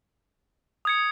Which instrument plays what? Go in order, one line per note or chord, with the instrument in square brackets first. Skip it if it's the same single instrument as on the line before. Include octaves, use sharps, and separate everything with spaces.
[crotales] D#6 G#6 C#7